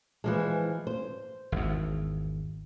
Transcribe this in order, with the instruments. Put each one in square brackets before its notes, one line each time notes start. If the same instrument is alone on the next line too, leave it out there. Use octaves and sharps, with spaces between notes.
[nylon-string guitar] E3 F3 G#3
C5
[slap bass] G#1 E2